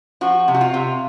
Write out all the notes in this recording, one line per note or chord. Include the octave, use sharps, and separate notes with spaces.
F3 F#4
C3
F#4
F4
C3